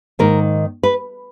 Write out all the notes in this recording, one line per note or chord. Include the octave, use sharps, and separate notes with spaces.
G#2 D#3 A#3 A#4
B4